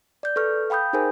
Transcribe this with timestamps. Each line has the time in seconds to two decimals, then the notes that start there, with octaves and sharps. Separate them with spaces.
0.23 D5 G6
0.36 A4 B4 C#6 F6
0.70 F5 G5 B5 D#6 G6
0.93 D#4 G#4 A#4 C5 G#5